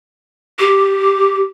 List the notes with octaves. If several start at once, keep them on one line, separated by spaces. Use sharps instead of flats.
G4